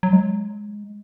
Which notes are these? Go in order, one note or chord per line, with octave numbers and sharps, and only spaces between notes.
F#3
G#3